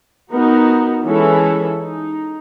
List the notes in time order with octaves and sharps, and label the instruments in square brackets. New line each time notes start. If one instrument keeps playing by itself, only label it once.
[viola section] B3 D#4 F#4 A#4
E3 G#3 C#4 E4 A4
D#4